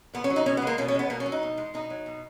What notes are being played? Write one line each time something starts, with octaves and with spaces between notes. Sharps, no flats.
A#2 B3
C#4
F#3
D#4
B2 C#4
B3
G#3
A#3
B2 C#4
C#4
G#3 B3
B2 A#3
C#4
F#3
D#4
B2
G#3
B2 D#4
F#3
B2